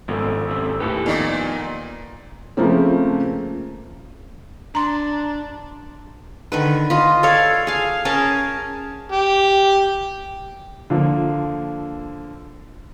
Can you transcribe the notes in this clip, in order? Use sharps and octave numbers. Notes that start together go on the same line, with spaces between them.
G#1 G#2 B2 F3 A4
F#2 C3 C4
D#2 A2 G4 A4 B4
F2 A#2 D#3 A#3 B3 D#4 D5
C#3 F3 A3 A#3 C4
D4 A#5 C6
D3 D#3 B4
F4 D#5
A4 C#5 D5 F5
G#4 F5
C#4 G#4 A#4 A5
G4
D3 F3 A#3